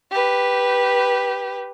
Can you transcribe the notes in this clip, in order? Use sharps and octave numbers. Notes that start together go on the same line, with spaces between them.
G4 B4